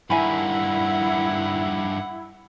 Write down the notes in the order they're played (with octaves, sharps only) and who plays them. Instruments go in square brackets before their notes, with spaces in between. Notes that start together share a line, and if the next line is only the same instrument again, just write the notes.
[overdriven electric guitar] G2 D#3 [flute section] E4 [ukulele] E5 G#5 B5 [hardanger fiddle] F#5